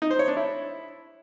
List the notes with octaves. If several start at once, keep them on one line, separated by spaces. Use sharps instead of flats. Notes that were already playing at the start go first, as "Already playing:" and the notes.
D#4
C5
C#5
D4
E4